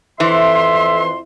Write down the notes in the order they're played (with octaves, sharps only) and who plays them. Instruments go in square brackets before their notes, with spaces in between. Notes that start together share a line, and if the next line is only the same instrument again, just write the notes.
[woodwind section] F2 C6 [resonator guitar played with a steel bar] E3 [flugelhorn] E5